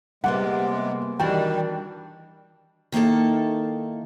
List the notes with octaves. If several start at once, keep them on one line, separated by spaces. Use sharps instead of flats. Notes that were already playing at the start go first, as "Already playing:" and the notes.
C3 G3 G#3 A#3 B3 F#5
D#3 E3 G3 D4 F#4 G5
D#3 A#3 D#4 E4 A4